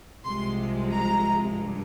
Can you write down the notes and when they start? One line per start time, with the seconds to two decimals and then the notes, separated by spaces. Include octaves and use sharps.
0.25 C2 C3 F3 G#3 C6
0.90 A#5
1.54 G2